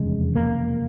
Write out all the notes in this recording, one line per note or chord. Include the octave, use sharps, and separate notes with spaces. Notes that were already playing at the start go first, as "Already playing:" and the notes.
Already playing: F1 E2 C#3 G#3
A#3